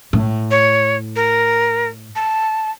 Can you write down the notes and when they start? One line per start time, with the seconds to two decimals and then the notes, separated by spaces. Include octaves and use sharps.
0.13 A2
0.51 C#5
1.16 A#4
2.16 A5